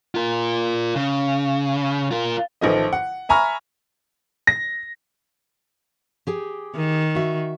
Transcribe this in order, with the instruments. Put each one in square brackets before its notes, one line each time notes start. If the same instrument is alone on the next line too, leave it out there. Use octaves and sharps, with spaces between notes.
[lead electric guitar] F4 A#4
C#3
F4 A#4
[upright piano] A1 D#3 F3 A3 D#5
F#5
E5 G#5 A#5 B5 C#6 F6
A#6
[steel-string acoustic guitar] G4 G#4 G5
[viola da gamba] D#3
[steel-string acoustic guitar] F#4 E5